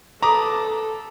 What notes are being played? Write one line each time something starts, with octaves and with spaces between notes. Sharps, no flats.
A4 B4 A#5 D6 D#6